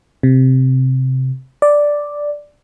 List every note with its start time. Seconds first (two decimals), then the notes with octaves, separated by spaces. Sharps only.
0.23 C3
1.62 D5